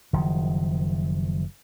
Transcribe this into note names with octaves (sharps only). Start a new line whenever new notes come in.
F#1 D#3 F3